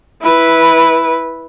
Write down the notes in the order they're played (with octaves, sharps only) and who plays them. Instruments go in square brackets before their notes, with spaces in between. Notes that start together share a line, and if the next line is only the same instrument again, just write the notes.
[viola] E4 B4